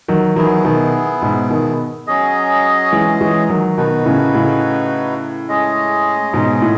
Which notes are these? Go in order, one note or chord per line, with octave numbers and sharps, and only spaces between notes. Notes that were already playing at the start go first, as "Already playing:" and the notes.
D#3 F#3
D#3 F#3 B3 E4 G#4
B2 D#3
G#2 B2
B2 D#3
F#3 C#4 G#4 D#5
E3 G#3
E3 G#3
D#3 F#3
B2 D#3 D#4 F#4 B4
A2 C#3
A2 C#3
G#3 C#4 G#4 D#5
G#2 B2
A2